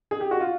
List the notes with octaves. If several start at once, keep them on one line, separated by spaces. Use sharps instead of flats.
G#4
G4
F#4
F4